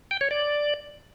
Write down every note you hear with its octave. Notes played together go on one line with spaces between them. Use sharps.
G5
C#5
D5